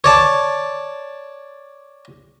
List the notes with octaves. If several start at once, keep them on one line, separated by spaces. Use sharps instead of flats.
C#5 D5 A5